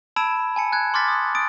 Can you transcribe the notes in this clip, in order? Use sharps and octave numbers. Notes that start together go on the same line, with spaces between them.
A5 B5 E6 G#6 D7 E7
G#5 A5 C#7
F#6 G#6
C6 D6 F6 A6 B6
D#6
D#6 A6 D7